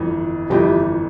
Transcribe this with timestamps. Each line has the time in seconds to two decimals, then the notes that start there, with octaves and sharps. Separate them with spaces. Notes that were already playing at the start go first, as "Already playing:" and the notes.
Already playing: G1 F2 E3
0.50 G1 F2 E3 G4